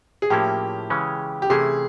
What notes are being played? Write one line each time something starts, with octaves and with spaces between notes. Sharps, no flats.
G#4
A2 F3 A#3 C#4 E4 G4
C#3 E3 G#3 C#4
G4
C3 E3 A3 C#4 E4 G#4